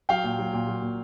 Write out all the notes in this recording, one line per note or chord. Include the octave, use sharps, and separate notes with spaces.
F#3 F5 G5
A#2
F#3
A#2
F#3
A#2